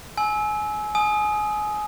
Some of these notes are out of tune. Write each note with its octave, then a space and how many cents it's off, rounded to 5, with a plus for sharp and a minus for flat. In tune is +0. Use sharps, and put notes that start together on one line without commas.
G#5 +25 E6 -20
G#5 +25 D#6 +5